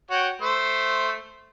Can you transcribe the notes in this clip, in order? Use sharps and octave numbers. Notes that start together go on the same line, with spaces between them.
F#4 C#5 G5
A3 C5